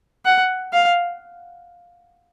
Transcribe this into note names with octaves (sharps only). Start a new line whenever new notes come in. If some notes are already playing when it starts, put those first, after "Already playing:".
F#5
F5